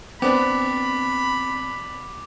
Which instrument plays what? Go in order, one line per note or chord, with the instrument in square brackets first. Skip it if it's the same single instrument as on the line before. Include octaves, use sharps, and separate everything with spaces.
[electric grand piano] B3 D4 [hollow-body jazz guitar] C4 D5 [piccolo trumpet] B5 [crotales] D6